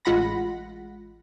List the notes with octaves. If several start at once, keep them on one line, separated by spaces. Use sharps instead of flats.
A1 G#3 F4 F#5 B5 A#6